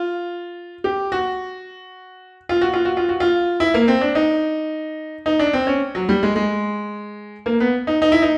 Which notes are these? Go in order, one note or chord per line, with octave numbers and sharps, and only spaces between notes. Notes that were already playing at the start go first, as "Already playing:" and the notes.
Already playing: F4
G4
F#4
F4
F#4
F4
F#4
F4
F#4
F4
E4
A#3
C4
D4
D#4
D#4
D4
C4
C#4
F#3
G3
G#3
G#3
A#3
B3
D#4
D#4
E4
D#4